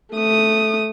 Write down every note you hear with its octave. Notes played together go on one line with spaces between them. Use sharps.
A3 D#6